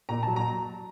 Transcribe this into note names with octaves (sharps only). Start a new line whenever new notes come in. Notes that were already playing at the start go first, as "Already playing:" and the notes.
A#2 A#5
F#3 A5
A#5